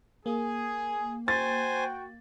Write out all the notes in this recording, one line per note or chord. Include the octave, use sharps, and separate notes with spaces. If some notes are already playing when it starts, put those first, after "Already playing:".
A#3 G#4
F#4 C5 G5 G#5 A6